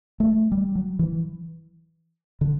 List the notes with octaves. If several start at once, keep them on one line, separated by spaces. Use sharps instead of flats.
A3
G3
F#3
E3
D3